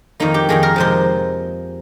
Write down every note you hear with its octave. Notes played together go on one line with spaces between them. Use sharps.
F2 D#3 A#3 D#4
G4
F2 D#3 A#3 G#4
A#4
C3 F3 G#3 C5